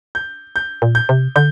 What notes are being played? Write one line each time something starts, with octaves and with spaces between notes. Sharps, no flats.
G6
G6
A#2
G6
C3
D3 G6